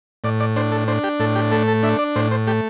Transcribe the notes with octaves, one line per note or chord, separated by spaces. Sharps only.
A2 D5
D5
D4 C5
A4
D4 C5
G4
A2 A4
G4
A3 A4
A4
D4 E5
D5
A2 C5
C5
A3 G4